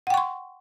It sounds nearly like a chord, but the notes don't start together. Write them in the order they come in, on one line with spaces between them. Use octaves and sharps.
F#5 G5 C#6 C6